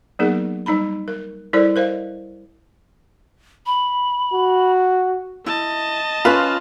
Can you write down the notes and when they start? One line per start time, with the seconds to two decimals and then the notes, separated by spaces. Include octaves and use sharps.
0.19 F#3 A#3 B3 D#4 G#4 A#4
0.66 G3 D#4 A#5 B5
1.08 A#4
1.53 G3 E4 A4 A#4 C5 D5
1.76 A#4 C5 D#5 F5
3.66 B5
4.34 F#4
5.46 E4 D#5 A5
6.25 C#4 F4 B4 B5